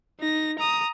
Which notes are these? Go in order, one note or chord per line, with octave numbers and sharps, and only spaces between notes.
D#4 A#6
A#5 D#6